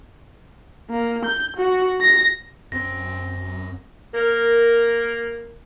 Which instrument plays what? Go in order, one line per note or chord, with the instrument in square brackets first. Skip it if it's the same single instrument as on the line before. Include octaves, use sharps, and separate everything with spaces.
[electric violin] A#3
G6
F#4
A#6
[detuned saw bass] F#2 [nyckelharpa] C4 [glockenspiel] A#6
[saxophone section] A#3 A#4